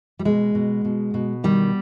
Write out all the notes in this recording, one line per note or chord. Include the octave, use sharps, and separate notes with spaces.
G3
B2 G#3
B2
B2
B2
D#3 G3